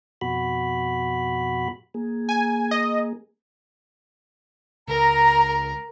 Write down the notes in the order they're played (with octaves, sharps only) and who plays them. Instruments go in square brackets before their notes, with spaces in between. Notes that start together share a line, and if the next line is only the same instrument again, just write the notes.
[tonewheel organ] F2 B2 F#4 B5
A#3 G#4
[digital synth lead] G#5
D#5
[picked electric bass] C#2 [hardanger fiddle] A#4 [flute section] A#5